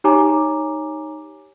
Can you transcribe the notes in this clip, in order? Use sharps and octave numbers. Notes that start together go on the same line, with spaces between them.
D#4 G4 C#5 G#5 A#5 D6